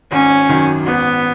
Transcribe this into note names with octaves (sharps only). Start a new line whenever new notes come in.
G#1 C#4
F#2 D#3
G#1 B3